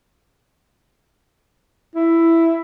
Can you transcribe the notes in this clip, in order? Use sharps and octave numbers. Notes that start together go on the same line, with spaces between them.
E4